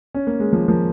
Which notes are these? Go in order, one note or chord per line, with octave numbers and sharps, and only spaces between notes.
C#4
A#3
G#3
F3 A#3
F3 A#3